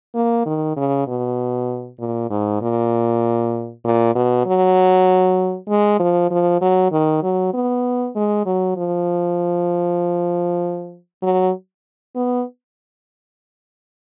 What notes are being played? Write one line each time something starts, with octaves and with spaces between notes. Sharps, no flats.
A#3
D#3
C#3
B2
A#2
G#2
A#2
A#2
B2
F#3
G#3
F3
F3
F#3
D#3
F#3
B3
G#3
F#3
F3
F#3
B3